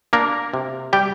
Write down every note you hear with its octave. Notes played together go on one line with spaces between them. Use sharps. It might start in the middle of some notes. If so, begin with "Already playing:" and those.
A#3 D4 A#4
C3
G3 G4 G5